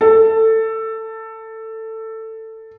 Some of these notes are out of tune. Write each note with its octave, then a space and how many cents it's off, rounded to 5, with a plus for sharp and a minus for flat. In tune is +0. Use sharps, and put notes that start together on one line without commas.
A4 +15